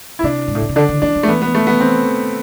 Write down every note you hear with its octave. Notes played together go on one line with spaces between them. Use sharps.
E4
C3 D4
G#2
A2
B2
C3
D3 D4
D3
E3 D4
F3
A3
E3 B3
B3
A3
B3
C4